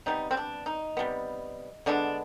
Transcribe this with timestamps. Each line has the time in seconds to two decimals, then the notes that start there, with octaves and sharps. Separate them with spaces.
0.06 C3 G3 B3 D#4
0.31 C4
0.37 D4
0.66 D#4
0.97 C3 G3 B3
1.86 D3 G#3 B3 D4